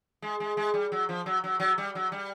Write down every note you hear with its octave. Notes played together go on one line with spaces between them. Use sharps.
G#3
G#3
G#3
G3
F#3
F3
F#3
F#3
F#3
G3
F#3
G3